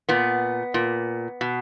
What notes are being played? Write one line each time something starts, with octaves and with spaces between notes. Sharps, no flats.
A#2 B3
A#2
B2